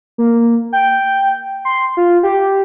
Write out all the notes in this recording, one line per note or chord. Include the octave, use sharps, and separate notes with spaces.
A#3
G5
C6
F4
G4